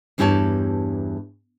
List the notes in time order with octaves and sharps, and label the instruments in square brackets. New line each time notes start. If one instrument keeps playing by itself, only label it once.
[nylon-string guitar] E2 G2 E4 G4 C#5 A5